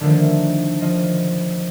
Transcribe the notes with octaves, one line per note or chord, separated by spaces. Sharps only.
D3 D#3 F3 A3 D4
F3 D#5